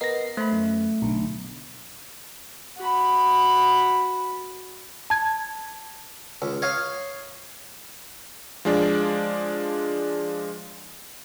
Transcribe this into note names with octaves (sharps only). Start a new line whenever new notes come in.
B3 A#4 D#5 A#6 C7
A3 C5 B5
F#2
B1 D3
F#4 B5
A5 G#6
C#2
C#5 D#5 F5
F3 G#3 D4